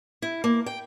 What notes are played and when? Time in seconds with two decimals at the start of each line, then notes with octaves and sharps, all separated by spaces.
0.22 E4
0.44 A#3
0.66 G5